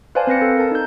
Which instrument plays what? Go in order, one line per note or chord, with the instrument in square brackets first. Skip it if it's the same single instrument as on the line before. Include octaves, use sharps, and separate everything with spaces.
[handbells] B4 C5 D5 F5 G#5 A5
C4 B4 A#6 C#7
A4
A#4 A5
D#4 G6